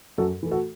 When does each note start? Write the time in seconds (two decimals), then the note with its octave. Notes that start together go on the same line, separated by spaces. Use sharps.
0.18 F#2 F#4 A4
0.43 E3 A3
0.51 F#4 A4